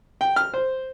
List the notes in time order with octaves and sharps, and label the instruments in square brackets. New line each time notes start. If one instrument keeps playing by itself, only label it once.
[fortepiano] G5
F6
C5